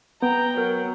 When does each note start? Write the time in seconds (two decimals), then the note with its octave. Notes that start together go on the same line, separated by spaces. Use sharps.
0.22 B3 G5 A#5
0.58 F#3 A#4